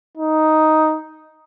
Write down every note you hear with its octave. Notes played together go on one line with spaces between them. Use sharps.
D#4